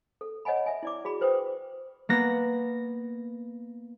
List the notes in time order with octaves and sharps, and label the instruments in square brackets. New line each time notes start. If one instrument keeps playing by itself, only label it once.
[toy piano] A4
C#5 D#5 F#5 G#5 B5
E5 G#5
E4 D5 D6
F#4 G#4 B5
B4 C5 G5 D#6
[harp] A#3 B3 A#6